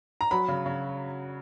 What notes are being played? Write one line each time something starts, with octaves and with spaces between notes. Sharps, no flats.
A#5
F#3 B5
C#3
C#3